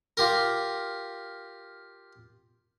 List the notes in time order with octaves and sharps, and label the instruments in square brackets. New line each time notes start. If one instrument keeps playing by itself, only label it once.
[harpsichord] F4 G4 A#4